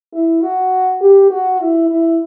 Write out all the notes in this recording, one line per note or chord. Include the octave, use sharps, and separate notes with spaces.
E4
F#4
G4
F#4
E4
E4